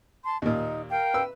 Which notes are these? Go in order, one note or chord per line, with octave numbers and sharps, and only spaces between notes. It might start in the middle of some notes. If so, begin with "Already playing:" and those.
A5 C6
D#2 A#2 D#4
A#4 F5 G5
B4 E6